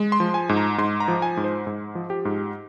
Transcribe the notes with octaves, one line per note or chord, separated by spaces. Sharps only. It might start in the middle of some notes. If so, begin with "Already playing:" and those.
Already playing: G#3
C6
F3
G#5
G#2
A#5
G#2 C6
A#5
F3
G#5
G#2
C5
G#2
F3
G4
G#2